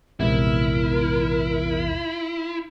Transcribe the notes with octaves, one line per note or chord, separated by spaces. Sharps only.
A#1 E2 G#2 C3 E4 A#4